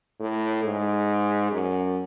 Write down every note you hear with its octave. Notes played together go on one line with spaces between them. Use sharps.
A2
G#2
F#2